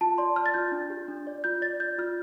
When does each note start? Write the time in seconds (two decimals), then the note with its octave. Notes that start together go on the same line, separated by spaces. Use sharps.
0.01 F4 A5
0.18 D5 C6
0.36 D5 F6
0.46 A6
0.54 F4 G6
0.72 D4
0.90 G4
1.08 D4
1.27 D5
1.44 F4 G6
1.62 D5 A6
1.80 D5 G6
1.98 F4 F6